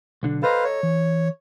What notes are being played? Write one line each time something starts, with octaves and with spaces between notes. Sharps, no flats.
B1 D3 D4
A4 B4 C5 D#5 F5 A#5
C#5
E3